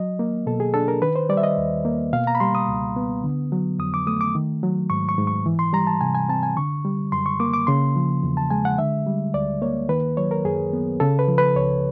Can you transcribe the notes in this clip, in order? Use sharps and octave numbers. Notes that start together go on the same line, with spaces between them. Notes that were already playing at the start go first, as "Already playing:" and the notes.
Already playing: F#3 D#5
A#3
B2 A4
G#4
D4 A4
A#4
D#3 B4
C5
G3 D5
E5
D#5
D#2
A#3
B2 F5
A#5
B5
G3 C6
D#6
C#2
B3
D3
F#3
F2 D#6
D6
A3 D#6
D6
D#3
F#3
G#2 C#6
C#6
G#2
C#6
E3
C6
G3 A#5
A5
C3 G#5
G#5
C4 A5
G#5
D3 C#6
G3
F#2 C6
C#6
A#3 D6
D6
C#3 C6
F3
E2
A5
G#3 G#5
F#5
D3 E5
G3
D2 D5
A#3 C#5
D#3 B4
F#3 C#5
A#4
F#2 G#4
B3
C#3 A4
B4
F3
B4
C#2 C#5